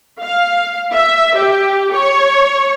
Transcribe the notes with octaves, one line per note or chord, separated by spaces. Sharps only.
F5
E5
G4
C#5